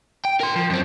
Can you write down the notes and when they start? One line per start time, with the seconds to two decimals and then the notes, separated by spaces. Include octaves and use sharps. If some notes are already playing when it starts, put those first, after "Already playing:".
0.25 G5
0.40 A#4 C6
0.56 F3
0.70 F#2 C4